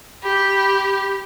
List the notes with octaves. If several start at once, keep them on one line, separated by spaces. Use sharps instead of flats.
G4 B5